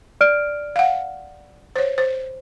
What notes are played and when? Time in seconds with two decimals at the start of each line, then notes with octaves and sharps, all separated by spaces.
0.21 D5 F6 D7
0.76 F5 F#5
1.76 C5 C#5
1.98 C5